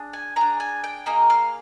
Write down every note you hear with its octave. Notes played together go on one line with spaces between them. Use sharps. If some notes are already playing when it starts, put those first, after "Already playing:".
Already playing: D4 G#4
G#5
D4 G#4 A#5
G#5
G5
A#3 D#4 G#4 D#5
F5